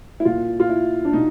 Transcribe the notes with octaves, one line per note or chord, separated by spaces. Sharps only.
E4
A#2 F4
F4
E4
D4
B2 D#4